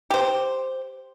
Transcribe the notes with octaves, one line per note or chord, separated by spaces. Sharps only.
G4 C5